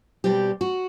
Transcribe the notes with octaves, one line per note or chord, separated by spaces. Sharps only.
B2 G3 C4 G4
F#4